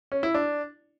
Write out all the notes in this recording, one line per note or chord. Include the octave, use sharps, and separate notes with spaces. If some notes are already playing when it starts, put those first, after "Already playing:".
C#4
E4
D4